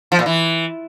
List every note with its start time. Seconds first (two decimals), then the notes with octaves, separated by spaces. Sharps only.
0.12 F3
0.19 A#2
0.26 E3